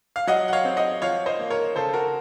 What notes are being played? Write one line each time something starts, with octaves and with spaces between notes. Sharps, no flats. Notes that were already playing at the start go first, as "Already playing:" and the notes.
F5
F#3 D#5 F#5
F#5
C#5 F5
C4
D#5 F#5
F3 C#5 F5
C5 D#5
A#3
A#4 C#5
C#3 A4 C5
F#4 A#4